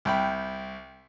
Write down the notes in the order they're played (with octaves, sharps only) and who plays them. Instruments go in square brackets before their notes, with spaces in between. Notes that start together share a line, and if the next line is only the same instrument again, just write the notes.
[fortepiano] C2 G5 B5